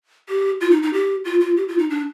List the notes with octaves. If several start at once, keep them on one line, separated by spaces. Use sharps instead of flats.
G4
F4
D#4
D#4
G4
F4
F4
G4
F4
D#4
D4